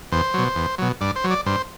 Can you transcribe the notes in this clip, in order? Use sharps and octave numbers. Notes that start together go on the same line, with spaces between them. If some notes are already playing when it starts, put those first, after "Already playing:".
E2 C5
B2 F#3
E2
B2 F#3
G2 D5
C5
F#3
D5
G2 C5